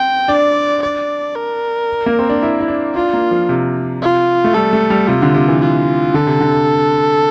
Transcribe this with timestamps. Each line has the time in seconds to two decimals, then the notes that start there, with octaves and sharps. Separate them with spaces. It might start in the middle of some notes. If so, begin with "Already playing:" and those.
Already playing: C4 G5
0.28 D4 D5
0.82 D5
1.35 A#4
2.06 A#3
2.19 C4
2.29 D4
2.42 E4
2.60 E4
2.68 D4
2.95 D4 F4
3.13 A#3
3.31 F3
3.49 C3
4.02 F4
4.44 A3
4.54 G3 A4
4.73 A3
4.90 G3
5.08 C3 F4
5.22 D3
5.34 C3
5.48 E3
5.61 F4
6.14 D3 A4
6.27 C3
6.40 D3